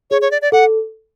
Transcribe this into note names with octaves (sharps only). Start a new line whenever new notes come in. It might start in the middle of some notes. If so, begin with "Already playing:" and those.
G#4 C#5
C#5
D5
D5
A4 F#5